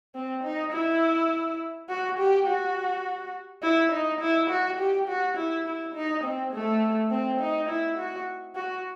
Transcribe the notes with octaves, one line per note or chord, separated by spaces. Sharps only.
C4
D#4
E4
F#4
G4
F#4
E4
D#4
E4
F#4
G4
F#4
E4
E4
D#4
C4
A3
C4
D#4
E4
F#4
F#4